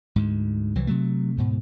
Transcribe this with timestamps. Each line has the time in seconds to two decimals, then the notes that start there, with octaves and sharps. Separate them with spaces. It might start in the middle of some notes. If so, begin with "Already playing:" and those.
0.16 D2 G#2
0.75 C2 E3 F#3
0.87 C3 F#3 A3
1.36 D2 G#2 B2